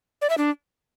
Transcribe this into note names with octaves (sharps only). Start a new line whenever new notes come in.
D5
E5
D4